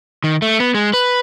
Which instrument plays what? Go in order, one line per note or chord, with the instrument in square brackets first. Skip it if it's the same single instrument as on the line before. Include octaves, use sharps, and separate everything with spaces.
[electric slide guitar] D#3
A3
B3
G#3
B4